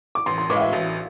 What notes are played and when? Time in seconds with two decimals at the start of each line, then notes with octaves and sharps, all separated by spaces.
0.15 D6
0.26 A1 C6
0.38 C6
0.50 A2 E3 G#3 D6
0.56 F5
0.61 E5
0.73 A1